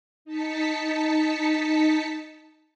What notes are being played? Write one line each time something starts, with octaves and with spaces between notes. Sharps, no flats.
D#4 A5 B6 C#7